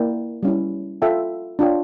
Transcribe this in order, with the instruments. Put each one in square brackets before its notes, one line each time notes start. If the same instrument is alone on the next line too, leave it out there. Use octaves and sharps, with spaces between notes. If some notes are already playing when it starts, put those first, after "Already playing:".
Already playing: [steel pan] A#3 E4 A#4 D5 G5
G3 C#4 E4
F4 A4 E5 G5
D4 F4 C#5 G5